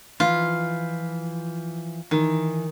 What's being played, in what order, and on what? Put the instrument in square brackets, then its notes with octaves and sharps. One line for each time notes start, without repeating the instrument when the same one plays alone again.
[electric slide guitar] E3 F3 B4 [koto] F4
[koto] D#3 [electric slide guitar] E3